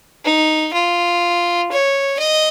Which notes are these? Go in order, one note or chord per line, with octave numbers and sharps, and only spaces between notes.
D#4
F4
C#5
D#5